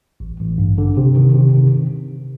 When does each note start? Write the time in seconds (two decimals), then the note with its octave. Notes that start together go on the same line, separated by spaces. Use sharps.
0.20 A1
0.40 A1
0.58 G2
0.78 D3
0.97 C3
1.16 D#3
1.35 C3
1.53 D#3